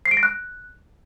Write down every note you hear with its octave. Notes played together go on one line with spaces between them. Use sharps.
C7
D7
A#6
F#6